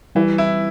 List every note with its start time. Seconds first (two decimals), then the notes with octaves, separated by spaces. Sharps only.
0.15 E3 G3
0.38 E4